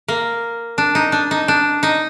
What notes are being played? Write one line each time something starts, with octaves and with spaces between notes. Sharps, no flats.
A#3
D4
D#4
D4
D#4
D4
D#4